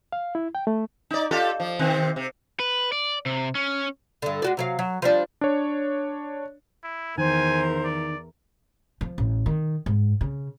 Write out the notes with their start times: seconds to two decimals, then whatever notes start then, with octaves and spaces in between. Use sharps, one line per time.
0.12 F5
0.35 E4
0.55 G5
0.67 A3
1.10 D#4 D5
1.31 F4 G4 A4
1.60 F3
1.79 C3 D#3 C4
2.16 C3
2.60 B4
2.92 D5
3.26 C3
3.55 C#4
4.22 G2 D3
4.42 G#3 F#4 D5
4.57 C3 F#3 F5
4.79 F#3
5.02 F3 G3 D4
5.41 D4 C#5
6.84 E4
7.18 E2 D#3 A#4 C5 G#5
7.84 D5
9.01 F3
9.18 A1
9.46 D#3
9.86 G#2
10.21 C#3